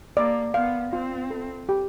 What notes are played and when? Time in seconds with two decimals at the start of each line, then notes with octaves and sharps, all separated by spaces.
0.16 A#3 D5
0.54 B3 F5
0.92 C4 F4
1.30 A4
1.69 G4